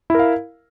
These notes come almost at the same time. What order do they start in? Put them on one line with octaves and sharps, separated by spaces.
E4 A#4 F5